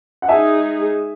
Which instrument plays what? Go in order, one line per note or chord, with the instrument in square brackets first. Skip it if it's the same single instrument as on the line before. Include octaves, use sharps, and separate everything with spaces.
[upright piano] F#5
[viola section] G#3 D#4 G#4 [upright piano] E5 G#5